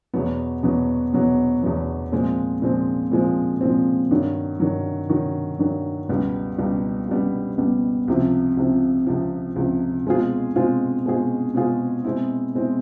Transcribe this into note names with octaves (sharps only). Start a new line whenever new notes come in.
E2 B2 F#3 B3
E2 B2 F#3 B3
E2 B2 F#3 B3
E2 B2 F#3 B3
A#2 F3 G#3 C4
A#2 F3 G#3 C4
A#2 F3 G#3 C4
A#2 F3 G#3 C4
G2 D#3 F#3
G2 D#3 F#3
G2 D#3 F#3
G2 D#3 F#3
C#2 B2 G3 B3
C#2 B2 G3 B3
C#2 B2 G3 B3
C#2 B2 G3 B3
C#2 C3 F3
C#2 C3 F3
C#2 C3 F3
C#2 C3 F3
B2 G#3 C4 F4 G#4
B2 G#3 C4 F4 G#4
B2 G#3 C4 F4 G#4
B2 G#3 C4 F4 G#4
B2 G#3 C4 E4
B2 G#3 C4 E4